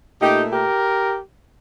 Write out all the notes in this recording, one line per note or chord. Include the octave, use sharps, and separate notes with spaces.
A#2 A3 D#4 G4
G4 A#4